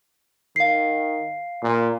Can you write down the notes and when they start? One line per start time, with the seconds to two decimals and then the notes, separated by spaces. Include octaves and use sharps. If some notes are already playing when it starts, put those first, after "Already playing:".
0.56 D#3 F5 C7
1.63 A#2